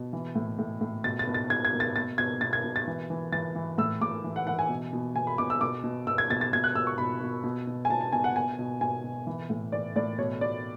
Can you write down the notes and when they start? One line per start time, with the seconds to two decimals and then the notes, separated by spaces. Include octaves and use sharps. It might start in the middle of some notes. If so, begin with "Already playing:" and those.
Already playing: B2
0.13 E3
0.35 A2
0.59 A2
0.81 A2
1.04 B2 A6
1.19 A6
1.27 B2
1.34 A6
1.50 B2 G#6
1.65 G#6
1.73 B2
1.80 A6
1.96 B2 A6
2.18 B2 G#6
2.41 B2 A6
2.53 G#6
2.64 B2
2.76 A6
2.87 E3
3.10 E3
3.32 E3 A6
3.55 E3
3.78 A2 E6
4.01 A2 D6
4.24 E3
4.36 F#5
4.47 E3 F#5
4.59 G#5
4.69 B2
4.93 B2
5.16 B2 G#5
5.27 B5
5.38 B2 D6
5.50 E6
5.61 B2 D6
5.84 B2
6.07 B2 E6
6.18 G#6
6.30 B2 A6
6.41 A6
6.53 B2 G#6
6.64 F#6
6.75 B2 E6
6.87 C#6
6.98 B2 B5
7.22 B2
7.44 B2
7.67 B2
7.85 G#5
7.90 B2 A5
8.01 A5
8.12 B2 G#5
8.24 F#5
8.35 B2 G#5
8.59 B2
8.81 B2 G#5
9.04 B2
9.27 E3
9.50 A2
9.72 E3 D5
9.96 A2 D5
10.18 B2 C#5
10.41 B2 D5